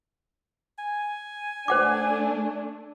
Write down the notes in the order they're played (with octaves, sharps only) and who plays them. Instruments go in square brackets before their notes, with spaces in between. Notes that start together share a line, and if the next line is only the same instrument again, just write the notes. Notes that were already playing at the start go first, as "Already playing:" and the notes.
[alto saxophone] G#5
[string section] A3 D4 [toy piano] C5 F#5 D6